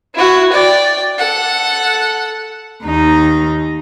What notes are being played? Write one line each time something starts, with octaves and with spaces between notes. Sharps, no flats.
E4 F#4
D5 G5
A4 F#5
D#2 D#4